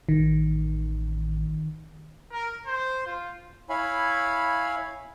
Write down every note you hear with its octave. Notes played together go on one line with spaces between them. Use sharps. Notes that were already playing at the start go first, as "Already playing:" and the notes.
A1 D#3
A#4
C5
F4
E4 C#5 F5 G#5 B5